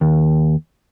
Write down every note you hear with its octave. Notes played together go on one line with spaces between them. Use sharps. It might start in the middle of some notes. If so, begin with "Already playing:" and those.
D#2